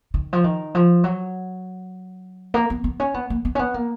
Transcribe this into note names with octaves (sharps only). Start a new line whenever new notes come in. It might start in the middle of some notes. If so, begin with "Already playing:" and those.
D#3
F3
D#3
F3
F#3
A#3
B3
B3
C#4
B3
A#3
B3
C#4
B3
A#3